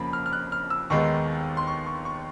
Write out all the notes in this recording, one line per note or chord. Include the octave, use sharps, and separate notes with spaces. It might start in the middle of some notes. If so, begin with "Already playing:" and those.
Already playing: F2 C#3 F3 A#3 B5
F6
F6
F#6
F6
E6
D#2 D#3 G#3 B3 C#6
C6
C#6
C#6
C#6